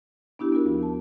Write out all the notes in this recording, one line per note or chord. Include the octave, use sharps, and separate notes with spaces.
B3 D4 E4 G4
B3 F4 F#4 A#4
D#2 F3
A5